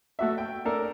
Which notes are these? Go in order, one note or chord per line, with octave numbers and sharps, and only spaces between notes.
A3 F#4 E5
G5
A3 D4 A4 A#4